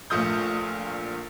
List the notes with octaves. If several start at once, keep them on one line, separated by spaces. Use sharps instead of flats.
A#1 A#2 A3 D#6 G6